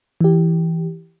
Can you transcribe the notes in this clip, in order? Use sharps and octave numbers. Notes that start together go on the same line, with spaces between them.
E3 G4